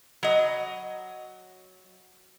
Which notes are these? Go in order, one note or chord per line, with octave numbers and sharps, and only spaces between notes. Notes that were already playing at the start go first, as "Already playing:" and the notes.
F#3 D#5